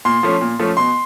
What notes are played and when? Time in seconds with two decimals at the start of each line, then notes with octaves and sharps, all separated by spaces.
0.05 A#2 C6
0.23 F3 A3 C#4
0.41 A#2
0.59 F3 A3 C#4
0.77 B2 C6